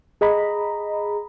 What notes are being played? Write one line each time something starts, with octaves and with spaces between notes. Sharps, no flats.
G#4 D#5 A#5 B5